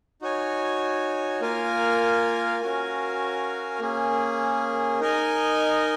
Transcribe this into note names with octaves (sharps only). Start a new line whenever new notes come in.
D#4 F#4 C#5 G#5
A#3 F4 A#4 F5 G#5
C#4 F#4 A#4 F5 G#5
A#3 C#4 G#4
D#4 A#4 D#5 G#5